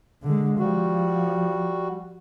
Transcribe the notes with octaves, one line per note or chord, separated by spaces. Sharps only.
D3 G#3
F3 G3 F#4